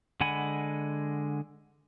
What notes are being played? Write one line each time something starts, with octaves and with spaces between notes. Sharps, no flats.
D3 G#3 F#5 G#5 B5